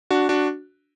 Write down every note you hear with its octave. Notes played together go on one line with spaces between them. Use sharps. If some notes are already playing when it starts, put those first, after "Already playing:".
D4 F#4
D4 F#4